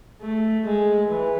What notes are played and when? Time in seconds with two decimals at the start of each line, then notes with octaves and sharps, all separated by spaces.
0.22 A3
0.65 G#3
1.08 E3